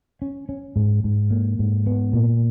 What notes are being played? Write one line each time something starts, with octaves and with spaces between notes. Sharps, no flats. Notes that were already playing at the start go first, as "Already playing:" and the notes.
C#4
C#4
G#2
G#2
A#3
G#2
B3
A#2